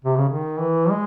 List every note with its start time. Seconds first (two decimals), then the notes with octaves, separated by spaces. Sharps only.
0.05 C3
0.17 C#3
0.29 D#3
0.59 E3
0.90 G#3